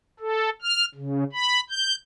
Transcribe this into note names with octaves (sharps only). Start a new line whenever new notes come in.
A4
F6
C#3
B5
G6